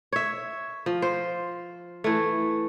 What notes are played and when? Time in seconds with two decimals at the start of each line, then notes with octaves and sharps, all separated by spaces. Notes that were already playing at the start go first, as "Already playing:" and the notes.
0.13 C#5 E5
0.86 F3
1.02 C5
2.04 E3 A3